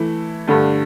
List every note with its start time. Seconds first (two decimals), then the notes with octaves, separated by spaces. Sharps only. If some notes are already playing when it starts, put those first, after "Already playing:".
Already playing: E3 A3 E4
0.47 G2 D3 A3